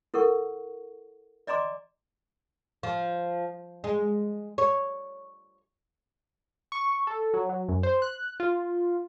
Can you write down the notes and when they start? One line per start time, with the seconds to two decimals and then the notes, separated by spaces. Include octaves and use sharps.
0.14 E4 A4 A#4 F#5 C#6
1.47 D5 D#5 G#5 A#5 C6 D6
2.83 F3
3.84 G#3
4.58 C#5
6.72 C#6
7.07 A4
7.34 F#3
7.49 F#3
7.69 F#2
7.83 C5
8.02 F#6
8.40 F4